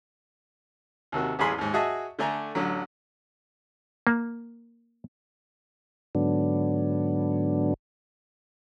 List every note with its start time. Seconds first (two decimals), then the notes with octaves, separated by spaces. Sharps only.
1.12 D#2 C3 D#3 F#4
1.39 A1 E2 E3 G#4 B5 C6
1.58 D#2 G#2
1.74 F#4 G#4 D#5 E5 A5
2.19 D3 A3 D4 G#5 A#5
2.55 A1 D3 F#3
4.07 A#3
6.15 G#2 D3 F#3 B3 D4